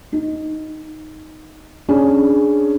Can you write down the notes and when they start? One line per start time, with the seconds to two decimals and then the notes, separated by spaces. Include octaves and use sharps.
0.12 D#4
1.89 C#4 D4 G#4